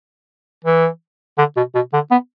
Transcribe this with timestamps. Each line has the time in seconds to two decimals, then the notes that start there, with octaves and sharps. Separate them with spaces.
0.65 E3
1.38 D3
1.57 B2
1.75 B2
1.93 D3
2.11 B3